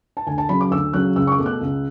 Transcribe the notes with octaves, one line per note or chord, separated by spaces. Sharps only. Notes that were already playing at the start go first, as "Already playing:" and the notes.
A5
D2 G#5
A5
C#3 F#3 B5
D6
D2 E6
C#3 F#3 F#6
C#2 E6
C#6
D6
B2 A3
F#6
C#2